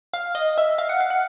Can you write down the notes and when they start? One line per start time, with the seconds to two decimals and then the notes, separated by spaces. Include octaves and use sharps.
0.14 F5
0.35 D#5
0.58 E5
0.78 F5
0.89 F#5
1.01 F5
1.10 F#5